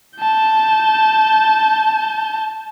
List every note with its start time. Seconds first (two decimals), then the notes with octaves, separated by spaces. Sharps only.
0.18 A5 G6